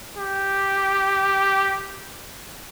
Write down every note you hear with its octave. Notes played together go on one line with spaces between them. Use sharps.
G4